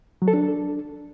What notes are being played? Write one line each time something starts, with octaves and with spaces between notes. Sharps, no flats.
F#3
A4
D4